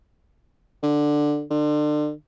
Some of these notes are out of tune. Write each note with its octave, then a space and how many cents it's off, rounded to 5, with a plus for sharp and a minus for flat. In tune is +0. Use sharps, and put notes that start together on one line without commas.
D3 +10
D3 +35